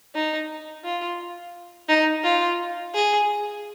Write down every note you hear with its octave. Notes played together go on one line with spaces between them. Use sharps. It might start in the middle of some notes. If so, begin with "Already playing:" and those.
D#4
F4
D#4
F4
G#4